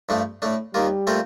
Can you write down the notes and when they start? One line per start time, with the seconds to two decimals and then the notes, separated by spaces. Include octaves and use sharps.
0.09 G2 F3 A3 D4
0.42 A2 A3 D4
0.74 D#2 D#3 G3 A#3 F4
1.07 A#2 A3 C4 F4 C5